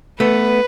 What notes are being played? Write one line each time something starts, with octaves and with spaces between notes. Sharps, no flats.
A3 B3 B4